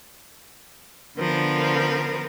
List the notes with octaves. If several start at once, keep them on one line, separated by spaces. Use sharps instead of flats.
D3 F3 B3 A#4